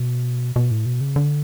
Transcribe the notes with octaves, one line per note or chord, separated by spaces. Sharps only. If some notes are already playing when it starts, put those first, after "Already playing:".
Already playing: B2
B2
A2
B2
C#3
D3